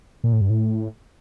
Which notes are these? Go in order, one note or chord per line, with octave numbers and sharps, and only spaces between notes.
A#2
A2
G2
A2